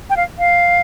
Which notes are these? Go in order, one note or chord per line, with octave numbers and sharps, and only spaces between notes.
G5
F5
F5